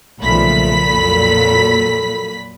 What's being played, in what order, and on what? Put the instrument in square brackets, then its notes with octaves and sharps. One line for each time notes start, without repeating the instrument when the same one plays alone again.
[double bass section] B1 C#3 F3 [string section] A#2 B5 B6 [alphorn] A3
[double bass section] F2 F#3 A#3 [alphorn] A4